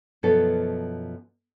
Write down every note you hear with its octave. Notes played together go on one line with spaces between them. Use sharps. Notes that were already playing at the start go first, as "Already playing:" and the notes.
F#2 B2 F3 B3 A4